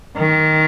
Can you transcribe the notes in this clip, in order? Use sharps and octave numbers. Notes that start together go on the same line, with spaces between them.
D#3